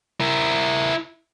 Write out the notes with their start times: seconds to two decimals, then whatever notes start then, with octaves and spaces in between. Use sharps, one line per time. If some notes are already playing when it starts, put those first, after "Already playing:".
0.20 E4 A#4